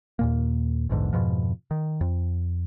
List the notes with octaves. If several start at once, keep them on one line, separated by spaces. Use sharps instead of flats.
D#2 A#2 A#3
A#1 E2 G#2 D3
F2 G#2 B2 F3
D#3
F2